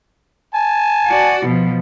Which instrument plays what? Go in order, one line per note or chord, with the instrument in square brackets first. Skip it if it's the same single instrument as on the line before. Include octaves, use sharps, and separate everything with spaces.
[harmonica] G#5 A5
[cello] F#4 D5
B2 F3